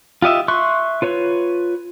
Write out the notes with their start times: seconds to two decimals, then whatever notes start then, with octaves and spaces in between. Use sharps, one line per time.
0.22 F4 G4 D#5 E5
0.48 E5 C6 C#6 F#6
1.02 F4 B4 C#5